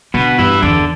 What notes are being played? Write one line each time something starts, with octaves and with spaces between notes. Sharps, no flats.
B2 D3 B3
G2 E3 E4
E2 D3 D4